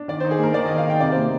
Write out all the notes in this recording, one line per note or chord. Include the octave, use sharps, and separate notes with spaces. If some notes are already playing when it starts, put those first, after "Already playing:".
Already playing: D4
D#3 D5
D#4 C5
G#4
A#3 A#4
D#3 D5
D#3 D#5
F5
D#4 G5
C3 D5
A#3 C5